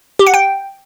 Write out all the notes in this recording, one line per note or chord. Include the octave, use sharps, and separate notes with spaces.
G4
F#5
G5